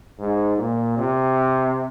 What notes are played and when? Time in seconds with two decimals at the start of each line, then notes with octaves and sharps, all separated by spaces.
0.19 G#2
0.58 A#2
0.98 C3